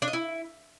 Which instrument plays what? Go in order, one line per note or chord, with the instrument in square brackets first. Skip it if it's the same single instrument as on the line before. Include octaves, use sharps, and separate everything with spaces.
[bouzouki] D4
D#5
E4